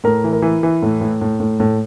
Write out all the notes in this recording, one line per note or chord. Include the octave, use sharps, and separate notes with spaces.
A2 A#4
E3
A#4
E3
E3
A2
A2
A2
A2
A2